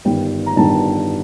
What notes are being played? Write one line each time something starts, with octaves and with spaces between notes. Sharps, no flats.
G1 G2 D#3 G5
A#5
G1 G2 D#3 A5